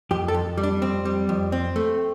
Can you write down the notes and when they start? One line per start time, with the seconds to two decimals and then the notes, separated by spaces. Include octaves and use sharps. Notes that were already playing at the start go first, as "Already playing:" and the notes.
0.11 F2 G4
0.28 A4
0.34 F2
0.57 G3
0.63 D4
0.82 F2 C4
1.05 G3
1.29 F2
1.52 C4
1.76 A3